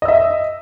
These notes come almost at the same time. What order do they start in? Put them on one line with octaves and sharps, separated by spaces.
D#5 E6 E5